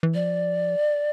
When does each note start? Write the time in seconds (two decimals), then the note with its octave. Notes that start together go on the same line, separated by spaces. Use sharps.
0.03 E3
0.14 F3 D5